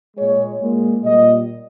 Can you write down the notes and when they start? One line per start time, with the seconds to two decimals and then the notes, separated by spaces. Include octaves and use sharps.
0.16 A#2 G#3 C#5
0.60 A#2 G#3
1.04 A#2 G3 D#5